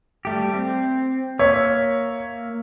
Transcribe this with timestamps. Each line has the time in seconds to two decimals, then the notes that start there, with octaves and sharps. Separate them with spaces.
0.25 G3 A3 G4
0.54 C4
1.39 A#3 C#5 E5